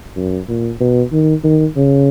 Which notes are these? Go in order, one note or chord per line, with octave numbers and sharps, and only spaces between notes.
F#2
A#2
B2
D#3
D#3
C#3